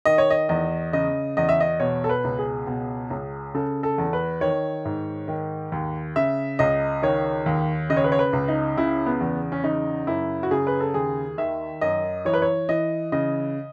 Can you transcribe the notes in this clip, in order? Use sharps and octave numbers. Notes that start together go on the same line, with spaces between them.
D#3 D#5
C#5
D#5
E2 D#5
C#3 D#5
E2 D#5
E5
D#5
B2 C#5
A4
B4
C#2
G#4
B2
C#2
C#3 A4
A4
E2
B4
D#3 C#5
G#2
D#3
D#2
C#3 E5
C#2 D#5
D#3 C#5
D#2
C#3 D#5
C#5
B4
C#5
B4
C#2
D#4
C#3 E4
B3
E2
C#4
C#3 D#4
F#2 E4
F#4
C#3 G#4
B4
A4
D#2 G#4
D#3 E5
F#2 D#5
E3 C#5
B4
C#5
E3 D#5
C#3 D#5